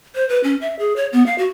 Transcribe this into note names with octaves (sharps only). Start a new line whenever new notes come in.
C5
B4
C#4
E5
G#4
C#5
B3
F5
F#4